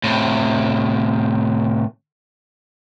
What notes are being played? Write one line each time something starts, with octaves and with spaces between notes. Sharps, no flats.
A2 C3